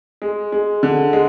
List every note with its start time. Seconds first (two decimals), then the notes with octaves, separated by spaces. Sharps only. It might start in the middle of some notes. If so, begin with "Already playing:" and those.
0.22 G#3
0.52 G#3
0.83 D3
1.13 G#3